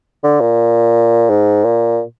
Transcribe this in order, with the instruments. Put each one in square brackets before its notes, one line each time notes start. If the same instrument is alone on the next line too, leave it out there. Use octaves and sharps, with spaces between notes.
[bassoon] D3
A#2
G#2
A#2